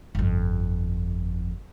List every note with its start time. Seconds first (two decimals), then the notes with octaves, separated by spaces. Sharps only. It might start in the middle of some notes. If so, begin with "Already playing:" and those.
0.15 G1 F2